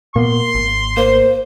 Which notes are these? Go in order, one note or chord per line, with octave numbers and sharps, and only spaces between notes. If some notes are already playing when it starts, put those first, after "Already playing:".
A#2 A#3 B3 C6
G#1
A#3 C5